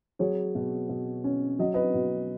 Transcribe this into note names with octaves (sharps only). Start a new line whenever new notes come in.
F#3 G#4 C#5
B2
B2
C#4
F#3 D#5
B4 D#5
B2